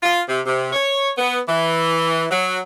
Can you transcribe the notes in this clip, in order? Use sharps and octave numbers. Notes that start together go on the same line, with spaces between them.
F4
C3
C3
C#5
B3
E3
F#3